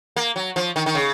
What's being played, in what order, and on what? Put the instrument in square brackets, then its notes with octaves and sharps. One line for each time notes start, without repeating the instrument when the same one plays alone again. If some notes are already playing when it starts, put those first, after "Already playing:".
[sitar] A#3
F#3
F3
D#3
D#3
C#3